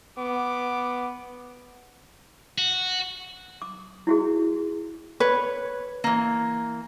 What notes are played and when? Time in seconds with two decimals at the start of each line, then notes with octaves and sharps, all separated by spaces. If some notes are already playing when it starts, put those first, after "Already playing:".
0.18 B3 D6
2.58 F#4
3.62 D6
4.07 E4 F#4 G#4
5.20 B4 C#5
6.04 E3 A#3